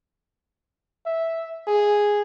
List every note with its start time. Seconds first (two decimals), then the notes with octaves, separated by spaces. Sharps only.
1.05 E5
1.67 G#4